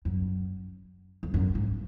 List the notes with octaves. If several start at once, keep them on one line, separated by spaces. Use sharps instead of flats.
F#2
F2
F#2
G#2